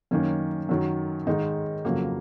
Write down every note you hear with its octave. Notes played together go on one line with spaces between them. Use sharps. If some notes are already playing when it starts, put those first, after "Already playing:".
F#2 D#3 A#3 C#4
F#2 D#3 F#3
G#2 D#3 G#3 D#4
F2 C#3 F#3 A#3